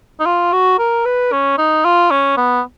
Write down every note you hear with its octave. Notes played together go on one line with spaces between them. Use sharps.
D#4
F4
F#4
A#4
B4
C#4
D#4
F4
C#4
B3